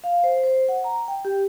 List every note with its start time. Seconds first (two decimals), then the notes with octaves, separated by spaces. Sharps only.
0.04 F5
0.24 C5
0.44 C5
0.68 F#5
0.84 A#5
1.08 G5
1.25 G4